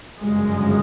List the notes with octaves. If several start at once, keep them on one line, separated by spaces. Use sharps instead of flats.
G1 F#2 C#3 G#3